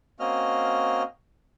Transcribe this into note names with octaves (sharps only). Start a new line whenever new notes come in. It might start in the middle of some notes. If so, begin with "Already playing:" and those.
A#3 C4 C#4 F#4 D#5 F6